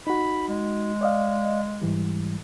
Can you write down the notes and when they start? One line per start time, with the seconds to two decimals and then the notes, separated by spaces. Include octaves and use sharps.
0.07 D#4 F#4 B5
0.48 G#3
1.01 D5 D#5 F5
1.82 G#2 E3 G3